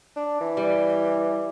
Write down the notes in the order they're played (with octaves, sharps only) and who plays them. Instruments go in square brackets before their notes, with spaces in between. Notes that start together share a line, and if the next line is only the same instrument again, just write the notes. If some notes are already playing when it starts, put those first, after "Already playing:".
[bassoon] D4
E3
[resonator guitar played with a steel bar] G3